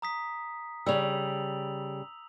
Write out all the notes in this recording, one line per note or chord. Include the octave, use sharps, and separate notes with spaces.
A#5 D#6 B6
C#3 G3 E6 F7 F#7